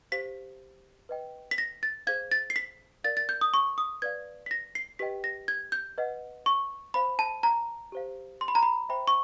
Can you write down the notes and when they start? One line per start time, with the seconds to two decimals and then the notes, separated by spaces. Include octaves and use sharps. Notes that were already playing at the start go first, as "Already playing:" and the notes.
0.12 G4 C5 F5 B6
1.09 B4 D#5 G5
1.51 B6
1.58 A#6
1.83 A6
2.07 G#4 C5 F5 G#6
2.31 A6
2.50 C7
2.56 B6
3.04 A#4 D5 F5 A6
3.17 A6
3.29 G6
3.41 D#6
3.54 C#6
3.78 D#6
4.02 B4 D5 F5 G#6
4.46 B6
4.51 A#6
4.75 C7
4.99 G4 B4 D#5 G5 B6
5.24 A#6
5.48 G#6
5.72 G6
5.98 B4 D#5 F#5
6.46 C#6
6.94 C5 F5 B5
7.19 A5
7.43 A#5
7.92 G4 C5 F5
8.41 C6
8.48 B5
8.55 A#5
8.63 B5
8.89 C5 E5 G5 B5
9.08 C#6